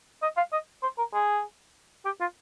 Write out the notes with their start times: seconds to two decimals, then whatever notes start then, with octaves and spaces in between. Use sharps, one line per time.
0.23 D#5
0.37 F5
0.53 D#5
0.83 C5
0.98 A#4
1.14 G#4
2.05 G4
2.21 F4